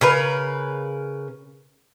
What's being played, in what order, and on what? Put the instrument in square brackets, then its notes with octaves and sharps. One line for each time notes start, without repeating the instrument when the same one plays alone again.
[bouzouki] C#3 A#4 B4